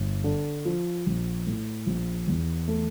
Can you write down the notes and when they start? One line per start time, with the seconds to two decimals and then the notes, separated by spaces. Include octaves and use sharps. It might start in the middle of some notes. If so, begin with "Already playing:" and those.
Already playing: G1
0.24 D3
0.65 F3
1.06 A#1
1.47 A2
1.87 A#1
2.28 E2
2.68 A3